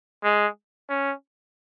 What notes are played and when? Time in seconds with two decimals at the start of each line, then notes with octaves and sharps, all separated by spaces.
0.24 G#3
0.89 C#4